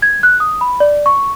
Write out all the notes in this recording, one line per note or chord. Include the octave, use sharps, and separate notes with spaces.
G#6
F#6
D#6
B5
D5
C#6